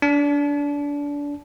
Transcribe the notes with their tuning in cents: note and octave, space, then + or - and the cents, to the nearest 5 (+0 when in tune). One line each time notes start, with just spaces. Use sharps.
D4 -25